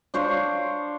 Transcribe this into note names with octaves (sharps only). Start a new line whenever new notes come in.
D4 C5 C#5 F5